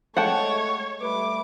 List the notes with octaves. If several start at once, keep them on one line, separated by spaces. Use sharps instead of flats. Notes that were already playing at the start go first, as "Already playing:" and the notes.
G#3 A3 C#5 F#5 G5 A5
G3 A3 B4 D6